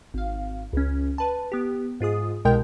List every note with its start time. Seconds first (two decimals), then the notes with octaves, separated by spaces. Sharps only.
0.14 G#1 F5
0.73 C#2 C#4
1.18 B4 A5
1.52 B3 G4
2.00 G#2 F4 G#4 D#6
2.45 C2 B2 G#3 A#4 G5 G6